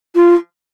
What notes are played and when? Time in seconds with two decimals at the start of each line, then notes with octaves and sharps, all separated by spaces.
0.15 F4